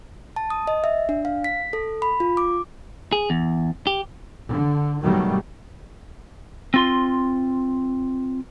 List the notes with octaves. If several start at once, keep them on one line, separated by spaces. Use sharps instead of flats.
A5
D#6
D#5
E5
D4
F5
B6
A4
B5
F4
D6
G#4
E2
G4
D3
G2 B2 D#3 F#3 G3 A3
C4 F4 C6